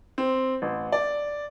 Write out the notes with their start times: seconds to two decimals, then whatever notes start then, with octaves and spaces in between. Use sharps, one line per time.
0.18 C4
0.62 A1
0.92 D5